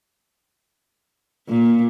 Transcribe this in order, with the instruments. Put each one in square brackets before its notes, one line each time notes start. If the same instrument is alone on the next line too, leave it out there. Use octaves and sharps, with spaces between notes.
[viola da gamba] A#2